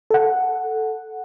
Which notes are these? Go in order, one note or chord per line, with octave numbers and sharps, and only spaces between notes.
A4 F#5